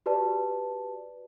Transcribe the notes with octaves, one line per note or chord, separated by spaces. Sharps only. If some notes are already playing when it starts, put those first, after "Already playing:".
F#4 G4 B4 D5 A5